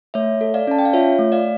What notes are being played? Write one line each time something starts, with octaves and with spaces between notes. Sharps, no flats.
A3 C#5 E5
A4
D5 F5
C#4 A5
G5
F5
F4 C#5 E5
A3
D5 F5